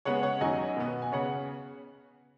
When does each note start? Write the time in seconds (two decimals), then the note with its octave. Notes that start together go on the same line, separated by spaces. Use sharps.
0.05 C#3 G#3 B3 C#5 F#5
0.23 C#5 F#5
0.41 F#2 D#3 F#3 C#4 D#5 G#5
0.76 B2 B3
1.02 G#5
1.12 C#3 B3 C#5 F#5